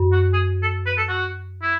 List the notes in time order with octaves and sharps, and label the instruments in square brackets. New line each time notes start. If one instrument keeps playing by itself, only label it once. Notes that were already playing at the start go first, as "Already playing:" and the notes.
Already playing: [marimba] F#2
[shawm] F#4
G#4
A4
B4
A4
F#4
E4